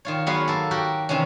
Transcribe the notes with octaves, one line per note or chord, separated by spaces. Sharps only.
D#3 F4 C#5
F#3 G#3 B3 F#4 B4 F5
A#3 A4
F#4 G4 A#4 G5
C3 D#3 E3 C#4